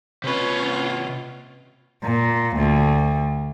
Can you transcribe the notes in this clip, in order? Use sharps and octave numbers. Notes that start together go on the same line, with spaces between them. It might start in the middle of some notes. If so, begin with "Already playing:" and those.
C3 C#4 F4 B4
A#2
D2